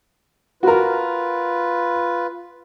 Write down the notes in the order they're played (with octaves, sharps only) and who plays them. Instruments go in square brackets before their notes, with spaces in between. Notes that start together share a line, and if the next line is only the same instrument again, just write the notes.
[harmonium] F4 B4 [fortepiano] F#4 A#4